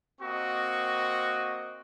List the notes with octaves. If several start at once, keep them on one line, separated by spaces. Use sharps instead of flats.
A#3 C4 F#4 D#5 C#6